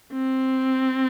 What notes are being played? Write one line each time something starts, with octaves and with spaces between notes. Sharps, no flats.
C4